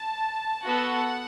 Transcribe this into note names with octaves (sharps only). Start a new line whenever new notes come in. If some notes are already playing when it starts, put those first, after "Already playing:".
Already playing: A5
B3 F#4 A4 F#5